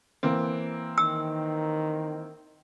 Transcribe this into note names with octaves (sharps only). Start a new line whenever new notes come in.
E3 A#3 C4
D#3 E6